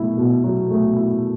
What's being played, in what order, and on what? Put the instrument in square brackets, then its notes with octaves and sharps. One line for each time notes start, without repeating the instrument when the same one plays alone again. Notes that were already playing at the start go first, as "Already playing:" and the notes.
Already playing: [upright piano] B2 F#3 A3 E4
B2
F#3
A3
E4